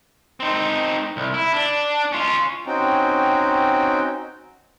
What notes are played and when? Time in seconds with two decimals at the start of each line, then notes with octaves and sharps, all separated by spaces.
0.40 C4 D#4
1.17 C2
1.34 E4
1.53 D4
2.12 C#4 F4
2.67 C4 C#4 D#4 F#4 G5